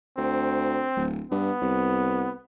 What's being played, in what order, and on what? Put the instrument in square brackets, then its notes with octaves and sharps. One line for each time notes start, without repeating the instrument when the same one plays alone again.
[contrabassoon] D2 [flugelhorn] C4
[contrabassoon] D1
[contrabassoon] G2 [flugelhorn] B3
[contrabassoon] C2